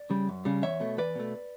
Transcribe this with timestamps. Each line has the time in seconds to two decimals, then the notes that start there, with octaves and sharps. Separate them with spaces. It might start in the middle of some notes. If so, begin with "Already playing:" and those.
Already playing: D5
0.10 C#3 G3
0.29 F#2
0.45 C#3 G3
0.62 E2 C#5 E5
0.80 B2 A3
0.97 E2 B4 D5
1.15 B2 A3